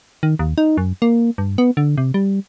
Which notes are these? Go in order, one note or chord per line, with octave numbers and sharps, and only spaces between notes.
D#3
D#2
D#4
F#2
A#3
G2
B3
D3
C3
G3